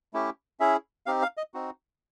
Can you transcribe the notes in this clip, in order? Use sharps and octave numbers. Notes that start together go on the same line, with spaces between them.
A3 C#4 E4 G4
C#4 E4 G#4 E5
C4 D#4 G4 F5
F5
D#5
C4 D#4 F#4